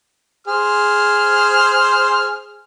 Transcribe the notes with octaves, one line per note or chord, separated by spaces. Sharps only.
G#4 C5 F6